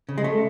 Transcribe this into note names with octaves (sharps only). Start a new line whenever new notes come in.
C#3
G#3
A3